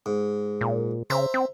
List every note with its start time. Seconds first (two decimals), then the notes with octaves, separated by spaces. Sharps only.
0.06 G#2
0.61 A#2
1.10 C#3 C5 E5 A#5
1.34 C4